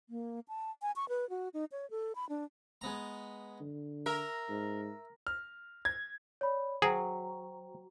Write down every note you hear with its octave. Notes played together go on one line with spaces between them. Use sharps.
A#3
A5
G#5
C#6
B4
F#4
D#4
C#5
A4
B5
D4
G#3 B3 A#5
D3
A#4 E5
G#2
F6
G#6
C#5 D5 B5
F#3 G#4 C5 G5